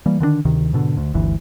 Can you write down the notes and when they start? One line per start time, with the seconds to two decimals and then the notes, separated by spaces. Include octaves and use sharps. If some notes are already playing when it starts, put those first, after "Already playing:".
0.06 E3 G3 A#3
0.20 D3 D#3 G#3 D4
0.45 D2 C3 D#3
0.73 G#2 B2 D3
0.97 D2
1.14 G1 D2 E3